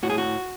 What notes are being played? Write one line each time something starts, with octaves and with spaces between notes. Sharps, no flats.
A2 F#4
G#4
F#4